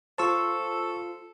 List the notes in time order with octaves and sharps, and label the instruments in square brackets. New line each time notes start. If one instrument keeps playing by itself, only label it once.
[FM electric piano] F4 C5 [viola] A4 [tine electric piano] A5 C#6 E6